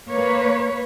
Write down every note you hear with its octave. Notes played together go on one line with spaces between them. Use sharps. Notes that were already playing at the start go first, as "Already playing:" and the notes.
A#3 B4 C#5